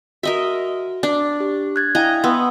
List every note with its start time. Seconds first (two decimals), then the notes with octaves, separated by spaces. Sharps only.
0.23 F#4 A#4 D#5 E5
1.03 D4
1.40 G4
1.76 F#6 G#6 A6
1.95 E4 D#5 F5 G5 G#5 A#5
2.24 B3 C6 D#6 E6